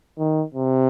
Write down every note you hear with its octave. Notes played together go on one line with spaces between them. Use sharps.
D#3
C3